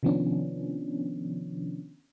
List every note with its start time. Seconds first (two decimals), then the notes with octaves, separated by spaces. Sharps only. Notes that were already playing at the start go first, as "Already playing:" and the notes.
0.03 C3 D#3 F3 B3 C#4 D4